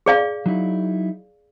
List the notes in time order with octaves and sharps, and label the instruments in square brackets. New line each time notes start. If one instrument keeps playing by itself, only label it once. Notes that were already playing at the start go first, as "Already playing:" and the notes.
[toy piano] G#4 D5 F5
[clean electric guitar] F#3 D#4 E4